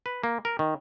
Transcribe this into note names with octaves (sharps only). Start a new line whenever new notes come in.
B4
A#3
A#4
D#3